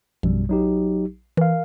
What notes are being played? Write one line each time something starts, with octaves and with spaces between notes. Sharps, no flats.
A#1 F#2 B2 G3
F#3 D#4 G4
E3 A#4 F5